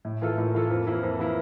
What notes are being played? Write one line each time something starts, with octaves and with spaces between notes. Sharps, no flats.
A2
E3 A#3 F4 A4
A2
E3 A#3 F4 A4
F2
E3 A#3 E4
F2
E3 A#3 E4